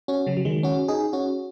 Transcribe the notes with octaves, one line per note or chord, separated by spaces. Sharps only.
C#4 F#4
C#3 F#3
F#3
D#3 G#3
C#4 F#4
D#4 G#4
C#4 F#4